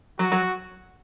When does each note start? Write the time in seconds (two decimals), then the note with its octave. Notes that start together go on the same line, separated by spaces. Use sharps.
0.19 F#3 F#4
0.32 F#3